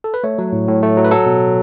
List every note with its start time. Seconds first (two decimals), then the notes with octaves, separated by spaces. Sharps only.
0.04 A4
0.14 B4
0.24 A3 C#5
0.38 F#3
0.52 A2
0.68 A2
0.83 A3
0.97 F#3
1.05 B4
1.11 F#3 A4
1.26 B2